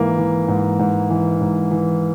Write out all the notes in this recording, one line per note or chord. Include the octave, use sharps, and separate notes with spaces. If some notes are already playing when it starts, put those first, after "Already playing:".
Already playing: G#2 E3 A#3
E3
G#2
G#2
E3
G#2
E3